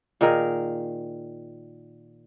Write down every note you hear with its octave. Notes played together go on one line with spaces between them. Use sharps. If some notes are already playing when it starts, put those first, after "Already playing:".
A#2 D#3 G#4 A#4